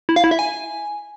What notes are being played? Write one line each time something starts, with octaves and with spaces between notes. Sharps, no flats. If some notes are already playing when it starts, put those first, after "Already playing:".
E4
F5
E4
E5
G#5